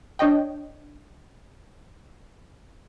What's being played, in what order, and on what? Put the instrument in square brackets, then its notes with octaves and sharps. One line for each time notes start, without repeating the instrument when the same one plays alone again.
[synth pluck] D4 C#5 D#5 G5